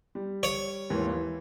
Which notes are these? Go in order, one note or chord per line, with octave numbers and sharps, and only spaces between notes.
G3
C#5
D#2 G#2 E3
E3